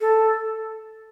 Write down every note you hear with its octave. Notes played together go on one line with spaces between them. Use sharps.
A4